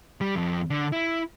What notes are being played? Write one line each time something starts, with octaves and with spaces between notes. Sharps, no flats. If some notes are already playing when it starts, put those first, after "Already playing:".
G3
F2
D3
E4